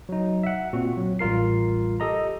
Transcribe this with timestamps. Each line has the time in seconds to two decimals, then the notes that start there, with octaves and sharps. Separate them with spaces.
0.09 F#3 D#4
0.43 E5 F#5
0.73 A#2 C4 F#4
0.97 F#3
1.19 A1 G3 F4 A#4 C7
2.00 G4 A4 D#5 A#5